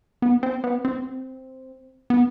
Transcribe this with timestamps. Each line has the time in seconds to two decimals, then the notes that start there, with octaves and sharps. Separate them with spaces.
0.22 B3
0.43 C4
0.64 B3
0.85 C4
2.10 B3